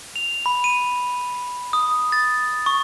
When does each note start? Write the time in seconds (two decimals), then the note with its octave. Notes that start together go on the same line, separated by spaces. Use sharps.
0.16 F7
0.46 B5
0.64 D#7
1.73 D#6
2.12 A6
2.66 C#6